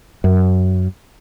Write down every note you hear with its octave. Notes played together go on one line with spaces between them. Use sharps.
F#2